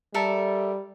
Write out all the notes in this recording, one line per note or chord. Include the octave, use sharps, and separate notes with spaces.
G3 A4 A#4 E5